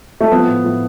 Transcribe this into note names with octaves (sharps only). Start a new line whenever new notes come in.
A3
F3 B3
A2
A2